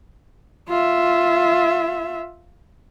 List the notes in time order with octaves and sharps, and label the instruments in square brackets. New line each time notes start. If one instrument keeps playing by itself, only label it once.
[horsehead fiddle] F4 E5